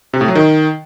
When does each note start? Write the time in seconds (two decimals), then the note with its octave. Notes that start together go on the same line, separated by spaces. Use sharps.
0.13 C3
0.21 A2
0.28 F#3
0.35 D#3